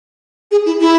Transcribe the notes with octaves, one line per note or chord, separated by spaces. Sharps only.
G#4
E4
E4